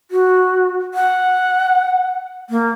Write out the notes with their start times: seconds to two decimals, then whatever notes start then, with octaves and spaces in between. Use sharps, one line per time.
0.11 F#4
0.94 F#5
2.50 A#3